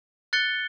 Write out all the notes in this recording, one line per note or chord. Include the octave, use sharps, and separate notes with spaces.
F#6 A6 C#7 G7